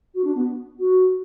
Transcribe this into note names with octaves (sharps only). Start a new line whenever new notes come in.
F#4
D4
B3
F#4